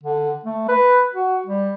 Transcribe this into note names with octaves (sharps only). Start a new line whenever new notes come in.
D3
A3
B4
F#4
G3